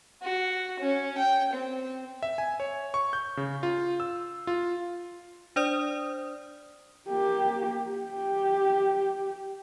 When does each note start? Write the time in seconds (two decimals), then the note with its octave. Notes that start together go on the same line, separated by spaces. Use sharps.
0.22 F#4
0.79 C#4
1.18 G5
1.53 C4
2.23 E5
2.38 G#5
2.60 C#5
2.94 C#6
3.13 G6
3.37 C#3
3.63 F4
4.00 E6
4.47 F4
5.56 D4 C5 D5 D#6
7.08 A#3 G4
7.97 G4